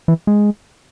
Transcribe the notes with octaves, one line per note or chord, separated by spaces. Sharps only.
E3
G#3